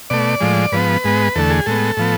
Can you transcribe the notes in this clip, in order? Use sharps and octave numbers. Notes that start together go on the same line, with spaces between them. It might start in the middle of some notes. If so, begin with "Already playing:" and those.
B2 A3 D5
A2 F3 G#3
G#2 F3 B3 B4
G#2 G#3 B3
E2 D3 A3 A4
G#4
A2 G#3 B3 A4
A2 F3 B3